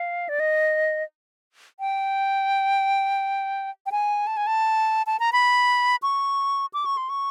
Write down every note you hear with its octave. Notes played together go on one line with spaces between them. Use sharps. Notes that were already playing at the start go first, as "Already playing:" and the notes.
Already playing: F5
D5
D#5
G5
G5
G#5
A5
G#5
A5
A5
A#5
B5
C#6
D6
C#6
C6
C#6